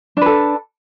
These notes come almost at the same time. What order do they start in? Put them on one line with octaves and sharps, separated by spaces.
D4 B4 A4